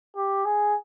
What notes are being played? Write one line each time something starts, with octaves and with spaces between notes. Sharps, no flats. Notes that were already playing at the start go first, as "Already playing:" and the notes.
G4
G#4